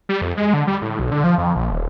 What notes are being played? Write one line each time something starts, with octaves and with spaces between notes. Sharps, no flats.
G3
F2
G#3
D3
G3
A2
B1
D3
F3
F2
A#1
D#1